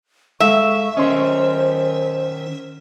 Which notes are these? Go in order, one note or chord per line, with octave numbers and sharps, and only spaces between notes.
G#3 A4 E5 F5 C#6
D#3 C#4 C5 D#5 C6